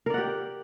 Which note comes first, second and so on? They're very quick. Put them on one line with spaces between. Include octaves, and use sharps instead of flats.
A#4 D5 F#5 G4